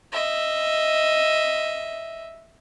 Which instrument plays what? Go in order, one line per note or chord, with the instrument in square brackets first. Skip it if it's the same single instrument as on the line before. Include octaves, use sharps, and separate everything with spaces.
[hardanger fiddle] D#5 E5